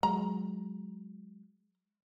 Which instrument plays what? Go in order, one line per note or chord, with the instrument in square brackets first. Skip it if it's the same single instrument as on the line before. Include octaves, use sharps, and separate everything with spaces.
[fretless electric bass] F#3 G#3 [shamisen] A#5